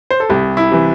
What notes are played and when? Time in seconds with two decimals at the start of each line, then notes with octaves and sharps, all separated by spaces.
0.10 C5
0.20 A4
0.29 C2 G4
0.57 E4
0.71 C3 E3